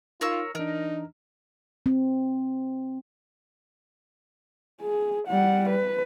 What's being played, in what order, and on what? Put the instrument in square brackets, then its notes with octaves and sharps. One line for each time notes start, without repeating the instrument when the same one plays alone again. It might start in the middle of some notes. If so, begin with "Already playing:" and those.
[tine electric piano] D#4 [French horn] F4 [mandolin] A#4 C#5 E6
[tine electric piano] E3 D4 [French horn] D#4 [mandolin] A#4
[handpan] C4
[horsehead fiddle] G#4
G3 F#5
B4